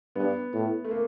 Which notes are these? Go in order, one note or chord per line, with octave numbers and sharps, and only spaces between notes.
G2 B3
A2
A3
A#3